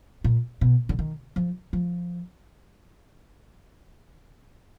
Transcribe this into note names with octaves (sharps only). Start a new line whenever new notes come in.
A#2
B2
D3
D#3
F3
F3